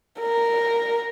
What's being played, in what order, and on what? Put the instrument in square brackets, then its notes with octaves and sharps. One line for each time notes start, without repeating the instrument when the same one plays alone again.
[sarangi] A#4